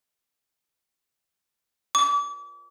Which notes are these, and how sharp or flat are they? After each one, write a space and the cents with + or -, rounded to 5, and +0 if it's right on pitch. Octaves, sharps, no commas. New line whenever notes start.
D6 -35